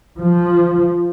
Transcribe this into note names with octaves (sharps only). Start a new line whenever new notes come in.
F3